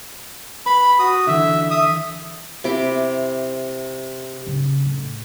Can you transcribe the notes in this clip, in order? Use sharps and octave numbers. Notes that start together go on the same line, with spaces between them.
B4 B5
F#4 D#6
D3 E3 E5
E5 D#6
C3 E4 D6
C#3
A2